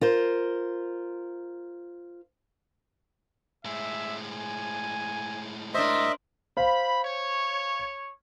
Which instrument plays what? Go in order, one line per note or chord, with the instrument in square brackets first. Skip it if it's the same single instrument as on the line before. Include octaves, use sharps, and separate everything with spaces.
[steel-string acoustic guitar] F4 A#4 C5
[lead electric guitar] A2 G#3 [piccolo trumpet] E5
[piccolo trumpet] G#5
[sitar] D4 C5 [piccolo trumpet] A#4 [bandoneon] D#5 E5
[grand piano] C5 F5 [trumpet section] B5
[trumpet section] C#5